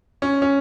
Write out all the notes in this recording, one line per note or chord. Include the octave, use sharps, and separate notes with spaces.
C#4
C#4